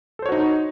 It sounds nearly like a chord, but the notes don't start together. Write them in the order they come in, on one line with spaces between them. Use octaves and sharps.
A4 C5 C#5 F#4 D#4